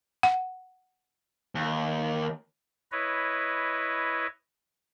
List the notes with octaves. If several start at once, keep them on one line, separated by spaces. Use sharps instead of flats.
F#5
D#2
E4 B4 C#5 D#5